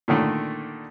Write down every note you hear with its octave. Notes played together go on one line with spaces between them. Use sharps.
A#2 D3 D#3 A3